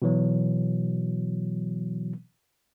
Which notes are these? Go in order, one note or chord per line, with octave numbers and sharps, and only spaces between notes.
B2 E3 F#3